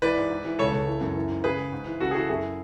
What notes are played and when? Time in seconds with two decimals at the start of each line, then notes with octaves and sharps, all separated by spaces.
0.02 E3 B4 D5
0.17 G#2
0.30 G#2
0.45 E3
0.59 C#2 A4 C#5
0.73 C#2
0.87 E3
1.01 F#2
1.16 E3
1.29 G#2
1.44 C#3 G#4 B4
1.58 C#3
1.72 G#2
1.86 E3
2.00 C#3 F#4 A4
2.11 G#4
2.15 E3 F#4 A4
2.29 F#2 E4 G#4